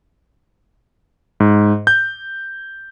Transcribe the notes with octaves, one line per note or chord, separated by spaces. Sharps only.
G#2
G6